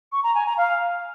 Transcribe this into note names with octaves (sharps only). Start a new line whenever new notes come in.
C#6
A#5
G#5
A#5
F5